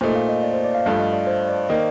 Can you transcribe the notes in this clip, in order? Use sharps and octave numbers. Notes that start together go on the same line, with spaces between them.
A#2 A3 D#4 C5
F5
D#5
D5
C5
D5
F5
G2 F3 A3 F5
D#5
D5
C5
D5
D#3 A#3 D#4